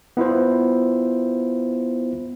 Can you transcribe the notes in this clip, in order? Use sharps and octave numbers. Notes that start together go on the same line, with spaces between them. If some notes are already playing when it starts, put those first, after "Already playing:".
B3 E4 F4 C5